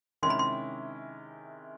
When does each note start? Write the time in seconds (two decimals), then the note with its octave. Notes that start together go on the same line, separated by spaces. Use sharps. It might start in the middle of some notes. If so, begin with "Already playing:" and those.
0.23 C3 D#3 G#3 C#4 E4 C6
0.30 B5
0.39 C6